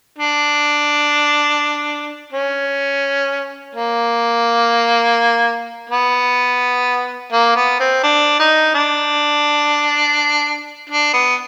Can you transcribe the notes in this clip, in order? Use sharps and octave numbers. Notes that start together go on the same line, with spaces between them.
D4
C#4
A#3
B3
A#3
B3
C4
D4
D#4
D4
D4
B3